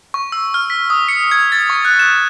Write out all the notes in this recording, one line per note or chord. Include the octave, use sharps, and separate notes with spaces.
C#6
E6
F6
B6
D#6
C#7
G#6
A6
C#6
F#6
E7